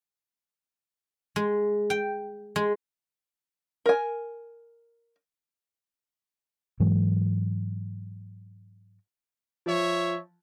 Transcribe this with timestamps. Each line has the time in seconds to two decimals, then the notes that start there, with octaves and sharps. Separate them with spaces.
1.36 G#3
1.90 G5
2.56 G#3
3.86 A#4 G#5
6.80 G#2 E3 F#3 G#3
9.66 F3 C#5 E5